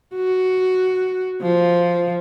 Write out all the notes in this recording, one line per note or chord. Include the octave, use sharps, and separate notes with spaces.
F#4
F3